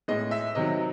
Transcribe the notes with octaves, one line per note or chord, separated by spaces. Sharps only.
A2 G#3 D#5
E5
C3 D#3 F#3 D#5